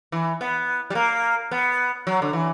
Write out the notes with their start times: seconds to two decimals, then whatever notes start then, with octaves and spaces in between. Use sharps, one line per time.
0.12 E3
0.41 B3
0.90 G3
0.95 A#3
1.51 B3
2.07 F#3
2.22 D3
2.33 E3